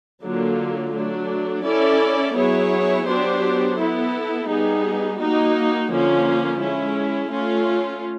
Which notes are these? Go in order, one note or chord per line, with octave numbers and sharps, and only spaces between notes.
D3 F#3 A#3 D4 F4
F#3 A3 D4
C#4 E4 A4 D5
F#3 B3 E4 G#4 C#5
F#3 B3 D4 G4 C5
B3 E4 A4
G3 B3 D#4 G#4
A#3 D#4 F#4
D3 F3 A#3 C#4 F4
G#3 C#4 E4
A3 C#4 F4